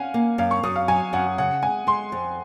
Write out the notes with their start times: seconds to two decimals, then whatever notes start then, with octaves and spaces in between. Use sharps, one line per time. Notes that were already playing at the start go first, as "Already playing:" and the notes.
Already playing: C#4 F5 F#5 G#5
0.14 A#3
0.38 F#2 F5
0.51 C#6
0.63 F#2 D#6
0.76 F5
0.88 F#3 G#5
1.13 F#2 F#5
1.38 C#3 F#5
1.62 G#3 G#5
1.87 G#3 C6
2.12 F2